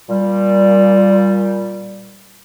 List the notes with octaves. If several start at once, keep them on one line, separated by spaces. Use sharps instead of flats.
A#2 G3